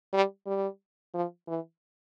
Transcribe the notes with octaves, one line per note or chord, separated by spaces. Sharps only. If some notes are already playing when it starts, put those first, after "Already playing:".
G3
G3
F3
E3